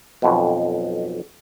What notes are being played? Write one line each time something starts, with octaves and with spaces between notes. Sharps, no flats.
B1 F2 B2